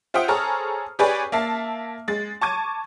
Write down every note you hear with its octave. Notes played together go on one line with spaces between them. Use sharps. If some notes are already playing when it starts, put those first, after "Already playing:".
F4 C5 E5 F#5 G5 D#6
G#4 A4 C5 C#5 A#5 F6
G4 G#4 B4 C#5 D5 G#5
A#3 E5 A5 C7
G#3 A6
A5 C#6 D6 G#6 D#7